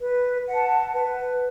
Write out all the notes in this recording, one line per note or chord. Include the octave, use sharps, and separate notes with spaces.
B4
F#5 A5
B4